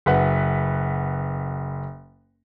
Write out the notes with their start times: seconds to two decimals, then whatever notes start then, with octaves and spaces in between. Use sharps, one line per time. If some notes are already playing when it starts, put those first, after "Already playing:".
0.06 F#1 B4 F#5